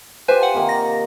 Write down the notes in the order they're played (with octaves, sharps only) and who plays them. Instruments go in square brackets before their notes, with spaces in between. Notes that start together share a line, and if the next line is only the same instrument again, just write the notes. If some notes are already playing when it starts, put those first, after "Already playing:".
[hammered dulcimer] F4 G4 [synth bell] B4 C5 G#5
[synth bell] F#5 G#5
[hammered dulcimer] C3 D#3 A#3
[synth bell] A#6